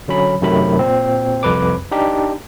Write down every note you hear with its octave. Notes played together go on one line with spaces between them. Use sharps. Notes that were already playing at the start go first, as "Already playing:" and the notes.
D3 F#3 C#4 B5
F#2 C3 D#3 F#3 A3 B5
A#2 C4
C2 F2 B4 D6
D4 D#4 G4